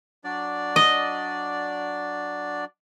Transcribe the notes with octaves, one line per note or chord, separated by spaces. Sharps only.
F#3 D4 D5
D#5